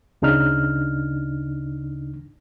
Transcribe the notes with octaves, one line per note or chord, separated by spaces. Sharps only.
D2 C#3 D4 D#4 F6